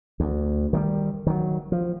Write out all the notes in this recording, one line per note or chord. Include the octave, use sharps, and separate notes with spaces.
D2
D#3 F#3 G3
D#3 F#3
F3